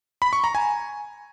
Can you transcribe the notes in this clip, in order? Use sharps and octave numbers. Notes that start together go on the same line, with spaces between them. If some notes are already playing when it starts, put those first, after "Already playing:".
B5
C#6
A#5
G#5